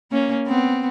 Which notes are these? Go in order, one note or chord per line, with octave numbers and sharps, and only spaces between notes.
A#3 C#4
B3 C4